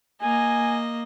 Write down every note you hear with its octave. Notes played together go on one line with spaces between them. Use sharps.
A#3 D#5 G#5